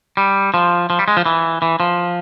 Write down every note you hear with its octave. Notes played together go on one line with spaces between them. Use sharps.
G3
F3
F3
G3
G#3
F3
E3
E3
F3